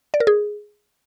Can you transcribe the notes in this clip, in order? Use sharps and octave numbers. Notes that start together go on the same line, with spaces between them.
D5
A#4
G#4